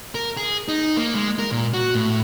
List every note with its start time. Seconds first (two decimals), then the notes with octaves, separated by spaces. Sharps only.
0.15 A#4
0.37 G#4
0.69 D#4
0.97 A#3
1.15 G#3
1.39 A#4
1.51 A#2
1.74 F#4
1.95 A2